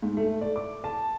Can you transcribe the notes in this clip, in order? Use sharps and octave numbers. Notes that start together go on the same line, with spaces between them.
G#2
A3
D5
D6
A5